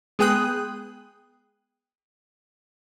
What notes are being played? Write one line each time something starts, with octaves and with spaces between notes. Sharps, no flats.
G#3 B3 G#4 G5 D#6 F#6